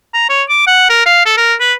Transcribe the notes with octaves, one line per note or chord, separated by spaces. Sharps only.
A#5
C#5
D6
F#5
A#4
F5
A4
A#4
B4